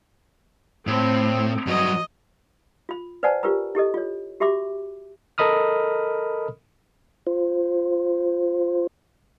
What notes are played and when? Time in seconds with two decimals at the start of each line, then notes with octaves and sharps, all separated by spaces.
0.87 A2 C4
1.67 G2 F#3 D#5
2.89 F4 B5
3.23 B4 C5 D5 F#5 G#5 A5
3.43 F4 G4 A#4 B4 A#5
3.75 E4 G4 A4 D#5
3.94 F4 C#5
4.40 F#4 G4 E5 B5 D6
5.38 A4 A#4 D#5 B5 D#6 F6
7.27 F4 C5